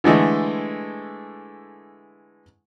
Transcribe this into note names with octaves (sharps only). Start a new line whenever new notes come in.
D3 E3 G#3 A3